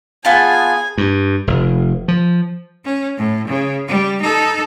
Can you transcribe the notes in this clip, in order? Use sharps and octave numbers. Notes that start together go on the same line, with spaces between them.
B3 F4 G#4 G#5 A5
G2
F1
F3
C#4
A2
C#3
G3
D#4 A4